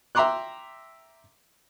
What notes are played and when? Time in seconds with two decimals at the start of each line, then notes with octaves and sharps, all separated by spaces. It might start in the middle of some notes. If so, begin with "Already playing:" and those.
0.15 E5 G5 A#5 C6 D6 F#6